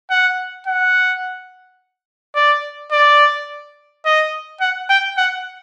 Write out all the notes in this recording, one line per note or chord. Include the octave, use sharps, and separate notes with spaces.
F#5
F#5
D5
D5
D#5
F#5
G5
F#5